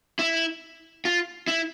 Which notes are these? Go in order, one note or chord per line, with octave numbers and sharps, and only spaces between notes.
E4
F4
E4